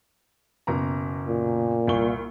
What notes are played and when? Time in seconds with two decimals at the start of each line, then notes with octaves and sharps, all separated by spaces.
0.67 F#1 B2 A#5
1.27 A#2
1.87 C2 C#6 G7